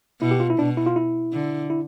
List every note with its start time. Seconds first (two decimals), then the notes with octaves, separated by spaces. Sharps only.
0.21 B2 E4
0.31 G4
0.40 F4
0.50 E4
0.59 B2 D4
0.77 E4
0.86 F4
0.96 E4
1.33 D3
1.70 E4